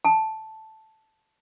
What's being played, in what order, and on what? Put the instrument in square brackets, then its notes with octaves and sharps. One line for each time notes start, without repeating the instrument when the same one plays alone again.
[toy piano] A5